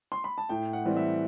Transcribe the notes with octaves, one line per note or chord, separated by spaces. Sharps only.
C6
B5
A5
A2 G5
F#5
E3 G3 C4
E5